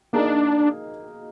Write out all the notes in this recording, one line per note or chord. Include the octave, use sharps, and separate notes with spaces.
A#3 D4 D#4 G#4 D#5